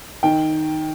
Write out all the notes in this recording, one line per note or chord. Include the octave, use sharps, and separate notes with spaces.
D#3 G5